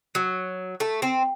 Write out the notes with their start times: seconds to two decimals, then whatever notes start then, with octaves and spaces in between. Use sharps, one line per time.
0.15 F#3
0.80 A3
1.02 C4